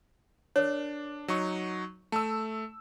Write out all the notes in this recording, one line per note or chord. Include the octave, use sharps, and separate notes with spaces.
D4 A#4 C#5
F#3 D#4 C#6
A3 A5 E6